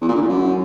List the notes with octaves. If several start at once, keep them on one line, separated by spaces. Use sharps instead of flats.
E2
A#2
D3
A2
F#2